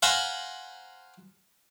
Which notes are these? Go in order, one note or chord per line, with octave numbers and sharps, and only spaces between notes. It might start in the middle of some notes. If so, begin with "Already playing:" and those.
C5 F5 F#5 G#5 A#5 B5